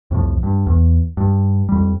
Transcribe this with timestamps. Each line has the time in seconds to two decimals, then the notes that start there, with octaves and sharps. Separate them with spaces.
0.11 C2 F2 A2 F3
0.43 G2
0.67 E2
1.17 G2
1.69 F2 G3